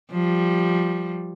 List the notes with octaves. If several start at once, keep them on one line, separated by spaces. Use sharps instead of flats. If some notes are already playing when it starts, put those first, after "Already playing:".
F3 G3